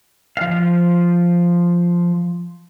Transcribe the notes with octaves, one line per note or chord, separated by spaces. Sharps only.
F3 F5